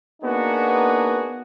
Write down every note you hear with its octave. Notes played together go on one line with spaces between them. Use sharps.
A#3 B3 D4 D#4 F#4 G#4